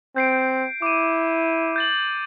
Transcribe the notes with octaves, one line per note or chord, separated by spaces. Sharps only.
C4 G6 C7 D7
E4 D6 D#7
G6 A6 F#7